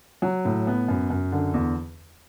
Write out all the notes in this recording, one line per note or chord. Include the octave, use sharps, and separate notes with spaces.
F#3
A2
B3
F#2
F#2
D3
E2